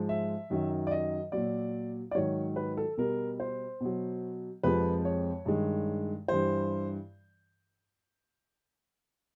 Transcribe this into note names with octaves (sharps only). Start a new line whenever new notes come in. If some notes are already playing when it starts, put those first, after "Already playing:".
Already playing: G#2 F3 G#3
E5
F#2 D#3 F#3
D5
D#5
A#2 F#3 D5
D5
G#2 D#3 F#3 C#5
B4
A4
B2 G3 A#4
C5
B2 F#3
F2 C3 F3 G#3 B4
C#5
G2 D#3 G#3
G2 E3 G3 C5